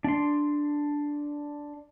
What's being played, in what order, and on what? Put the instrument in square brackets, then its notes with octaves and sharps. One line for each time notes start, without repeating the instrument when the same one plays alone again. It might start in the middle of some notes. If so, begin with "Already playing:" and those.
[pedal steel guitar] D4 C6